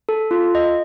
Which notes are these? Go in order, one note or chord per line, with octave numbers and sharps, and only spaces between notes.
A4
F4
D#5